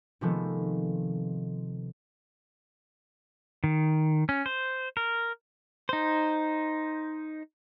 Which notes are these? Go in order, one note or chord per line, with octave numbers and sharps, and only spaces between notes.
C3 D#3 F3 G#3 A3 B3
D#3
C#4
C5
A#4
D#4 C5